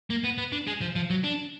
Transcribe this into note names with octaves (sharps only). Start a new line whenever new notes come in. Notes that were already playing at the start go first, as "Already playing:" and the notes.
A#3
B3
B3
D4
G#3
F3
F3
F#3
D4